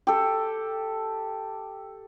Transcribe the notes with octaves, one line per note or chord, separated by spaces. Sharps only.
G4 A4